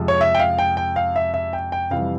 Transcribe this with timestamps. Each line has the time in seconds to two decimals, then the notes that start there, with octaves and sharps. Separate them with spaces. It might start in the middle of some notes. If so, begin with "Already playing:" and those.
Already playing: F2 C3 F3 G#3
0.08 C#5
0.21 E5
0.34 G5
0.39 F5
0.58 G5
0.77 G5
0.96 F5
1.16 E5
1.34 E5
1.53 G5
1.72 G5
1.91 F2 C3 E3 G3 F5